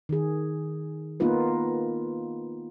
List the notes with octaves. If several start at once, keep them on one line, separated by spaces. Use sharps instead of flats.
D#3 G#4
A#3 B3 D#4 F4 B4